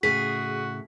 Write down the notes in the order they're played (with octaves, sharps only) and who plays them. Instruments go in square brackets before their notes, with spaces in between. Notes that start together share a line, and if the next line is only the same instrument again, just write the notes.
[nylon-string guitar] A2 C#3 [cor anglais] F#4 [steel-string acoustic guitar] G#4 [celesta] B6